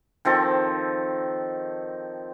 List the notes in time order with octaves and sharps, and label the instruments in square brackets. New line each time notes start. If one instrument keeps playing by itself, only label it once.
[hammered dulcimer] D#3 F3 C4 A4